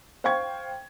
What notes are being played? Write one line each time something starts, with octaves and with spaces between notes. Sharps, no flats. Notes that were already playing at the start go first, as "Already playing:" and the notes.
C5 F5 G5 C#6 G#6